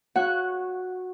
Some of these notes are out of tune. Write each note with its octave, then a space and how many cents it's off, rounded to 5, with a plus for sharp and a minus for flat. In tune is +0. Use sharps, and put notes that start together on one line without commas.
F#4 -15 C#5 +0 F#5 +0